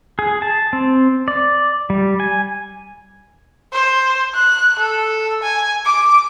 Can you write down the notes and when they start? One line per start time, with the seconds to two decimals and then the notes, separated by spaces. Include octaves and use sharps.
0.19 G#4
0.42 A5
0.73 C4
1.28 D5
1.90 G3
2.20 G#5
3.73 C5
4.35 F#6
4.79 A4
5.43 G#5
5.85 D6